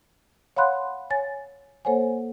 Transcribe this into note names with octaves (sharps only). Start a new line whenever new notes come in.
C#5 F5 F#5 B5 C6 F#6
C#5 G#5 A6
A#3 A4 C5 C#5 F#5 G#5